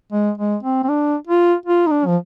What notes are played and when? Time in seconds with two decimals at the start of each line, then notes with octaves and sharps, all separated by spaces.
0.13 G#3
0.38 G#3
0.63 C4
0.84 C4
0.89 D4
1.27 F4
1.66 F4
1.87 D#4
1.91 D4
2.07 F3